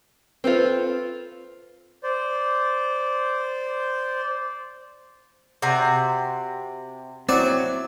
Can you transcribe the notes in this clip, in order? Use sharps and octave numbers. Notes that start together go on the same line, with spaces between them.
C4 F4 A4 B4 C5
C5 D5
C3 F#4 D5
F#3 C4 E4 D5 C#6